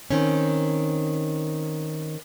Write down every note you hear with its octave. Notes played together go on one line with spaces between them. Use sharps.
D#3 C4 C#4